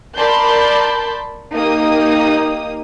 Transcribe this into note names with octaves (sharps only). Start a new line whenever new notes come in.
A#4 D5 A5 B5 C6 G6
A#3 D#4 G4 D#6